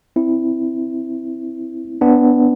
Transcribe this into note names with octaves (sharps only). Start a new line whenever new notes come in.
C4 E4
B3 D4